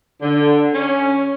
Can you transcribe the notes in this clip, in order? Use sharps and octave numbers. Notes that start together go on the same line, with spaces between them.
D3
C#4